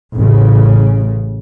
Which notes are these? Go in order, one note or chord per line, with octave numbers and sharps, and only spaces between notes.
A1 C#3